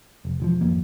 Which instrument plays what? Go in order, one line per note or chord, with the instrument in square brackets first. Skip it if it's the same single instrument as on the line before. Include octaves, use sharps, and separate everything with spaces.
[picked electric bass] F1
E1 E3 F3
G#1 F2 F3 A#3